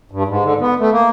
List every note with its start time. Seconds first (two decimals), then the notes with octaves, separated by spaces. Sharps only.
0.11 G2
0.28 G#2
0.44 D3
0.60 B3
0.79 A3
0.92 A#3